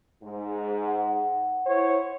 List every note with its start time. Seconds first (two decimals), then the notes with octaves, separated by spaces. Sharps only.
0.23 G#2
0.83 F#5
1.67 E4 C5 C#5